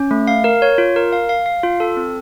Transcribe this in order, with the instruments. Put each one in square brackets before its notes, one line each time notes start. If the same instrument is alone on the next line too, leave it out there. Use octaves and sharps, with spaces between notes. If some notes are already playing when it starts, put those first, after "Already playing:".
Already playing: [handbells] C#4
A3
F5
A#4
C#5
F4
A#4
F5
F5
F5
F4
A4
C4